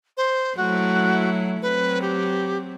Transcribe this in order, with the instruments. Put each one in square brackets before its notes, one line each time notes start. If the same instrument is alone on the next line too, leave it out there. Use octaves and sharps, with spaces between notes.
[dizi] C5
[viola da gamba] F#3 A3 E4 [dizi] F#4
[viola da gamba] F#3 C4 [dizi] B4
[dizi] G4